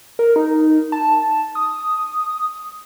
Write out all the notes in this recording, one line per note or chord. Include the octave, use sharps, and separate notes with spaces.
A#4
D#4
A5
D#6